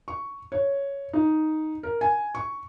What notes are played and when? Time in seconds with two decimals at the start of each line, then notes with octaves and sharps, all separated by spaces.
0.08 C#6
0.52 C#5
1.13 D#4
1.83 A#4
2.01 G#5
2.35 C#6